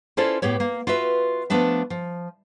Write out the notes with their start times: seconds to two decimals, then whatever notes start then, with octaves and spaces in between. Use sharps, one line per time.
0.17 C#4 E4 F4 A4 C5 D5
0.42 A2 B3 G4 C#5
0.60 A#3
0.87 F4 F#4 B4 E5
1.50 F3 A3 B3 D4 E5
1.90 F3